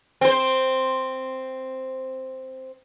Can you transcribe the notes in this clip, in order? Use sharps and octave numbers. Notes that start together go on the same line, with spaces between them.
C4 C5